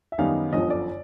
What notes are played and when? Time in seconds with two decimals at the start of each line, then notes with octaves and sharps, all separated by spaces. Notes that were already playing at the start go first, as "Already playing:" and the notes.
0.12 E5
0.18 F#2 D#3 G3 B3 D#4 F5
0.53 G1 F#2 D3 F3 D#5
0.70 D5